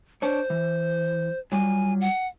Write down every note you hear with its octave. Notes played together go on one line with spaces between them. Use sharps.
D4 C5 C#5
E3
F#3 G3 F4 G#5
F#5